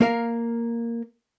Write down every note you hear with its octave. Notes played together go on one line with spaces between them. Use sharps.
A#3 A#4 F5